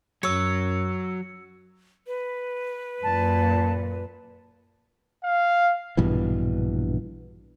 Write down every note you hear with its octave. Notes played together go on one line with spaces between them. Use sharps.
F#2 F#3 C#5 E6 C#7
B4
F#2 A#2 A5
F5
A#1 G2 B2 E3